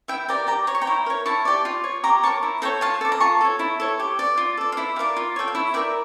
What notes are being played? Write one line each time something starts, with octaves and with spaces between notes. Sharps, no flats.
E4 E5 G5
G4 A#4 D5 G5 A#5
G4 G5 A#5
C#5 A#5
C#6
G5 A#5
E4
A#4 C#5
E4 A5 C#6
G4 D5
F4
C#5
G4 A#5 D6
A#4 C#5 A5 C#6
E4
A4 C#5 G5 A#5
F4 F5 A5
A4 D5
A#5
F4 A5 C#6
A4 C#5
E4
A4 C#5
G4
D5
F4
A4 D5
F5
E4 E5
G4 A#4 D5 F5
F4
A4 C#5 G5
F5
E4 E5
A#4 D5 E5 G5